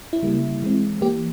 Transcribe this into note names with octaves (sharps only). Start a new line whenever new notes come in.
E4
C#3 G3 A#3
E3 G#3 C4
E3 A#3 G4